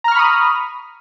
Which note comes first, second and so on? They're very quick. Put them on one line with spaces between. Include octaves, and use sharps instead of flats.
A#5 F6 C#6 B5 D#6